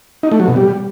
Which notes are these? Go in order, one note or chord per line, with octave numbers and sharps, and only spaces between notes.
D#4
A3
F#3
B2
G3